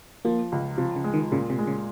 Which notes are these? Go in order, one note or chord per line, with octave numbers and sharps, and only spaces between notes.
F3 A#3
C#2
C3 F3
C#3
G#3
D#3
A#2 C#3
C3
G#3
C#3